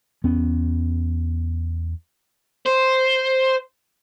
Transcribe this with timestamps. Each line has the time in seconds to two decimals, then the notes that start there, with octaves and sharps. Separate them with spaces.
0.24 E2 B3 C#4
2.66 C5